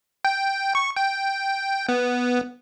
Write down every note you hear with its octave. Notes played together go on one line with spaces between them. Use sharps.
G5
C#6
G5
B3